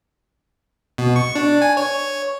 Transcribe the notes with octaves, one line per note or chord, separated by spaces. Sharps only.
B2
C#6
D4
G#5
C#5
C#5